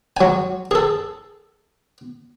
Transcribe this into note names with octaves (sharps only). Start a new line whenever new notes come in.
F#3 G#5
G#4 A4